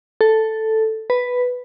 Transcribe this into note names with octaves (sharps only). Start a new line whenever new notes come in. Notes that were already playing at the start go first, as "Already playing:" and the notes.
A4
B4